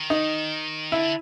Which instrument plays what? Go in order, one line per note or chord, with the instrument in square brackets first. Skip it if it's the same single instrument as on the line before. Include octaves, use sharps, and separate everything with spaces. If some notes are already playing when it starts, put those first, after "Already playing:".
Already playing: [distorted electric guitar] D#3
[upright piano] D#4
[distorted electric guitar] D3 [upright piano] E4